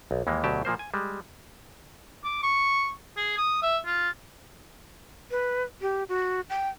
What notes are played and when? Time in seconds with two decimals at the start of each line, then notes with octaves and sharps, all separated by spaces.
0.11 B1
0.27 D#2 E3 G#3 A#3
0.44 D2 B2 F#3 G4 A5
0.65 A#2 F3 A#3 C5
0.79 G#5
0.94 G3 G#3
2.24 D6
2.43 C#6
3.17 G#4
3.38 D#6
3.63 E5
3.86 F4
5.31 B4
5.81 G4
6.09 F#4
6.50 G5